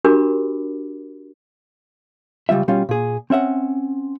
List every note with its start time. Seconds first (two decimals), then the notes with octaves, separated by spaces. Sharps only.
0.04 D4 F#4 G4 A#4 B5 D6
2.49 C#2 G3 F4 E5
2.68 B2 G3 C#4 F4
2.89 A#2 G#4
3.30 C4 C#4 E5 F#5